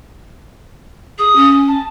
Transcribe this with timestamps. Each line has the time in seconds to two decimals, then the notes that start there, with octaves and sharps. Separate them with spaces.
1.18 G#4 D#6
1.36 C#4
1.67 A5